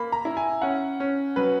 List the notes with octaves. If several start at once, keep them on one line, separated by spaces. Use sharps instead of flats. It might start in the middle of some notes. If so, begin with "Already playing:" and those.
Already playing: A#3 B5
A#5
E4
G#5
C#4 F#5
C#4
F#3 B4